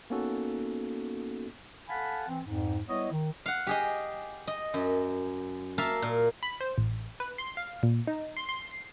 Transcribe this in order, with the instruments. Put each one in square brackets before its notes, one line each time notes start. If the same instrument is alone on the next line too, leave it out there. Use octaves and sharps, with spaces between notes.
[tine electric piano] A#3 B3 C#4 D#4 F#4 A4
[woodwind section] A4 F5 F#5 G#5 A5 B5
E3 C4
F2 G#2
G3 B3 E4 C#5 D#5
D#3
[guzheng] F5 F#5
G4 G#4 D#5
D#5
F#2
A#3 A#4 E5 F5 A5
A#2
[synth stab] B5
C5
A1
B4
C6
F5
A#2
D#4
C6
C6
C7